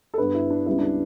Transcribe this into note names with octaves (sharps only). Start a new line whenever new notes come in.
A4
G2 D3 G3 B3 B4
E4
D4
C#2 C#3 G3 B3 E4
D4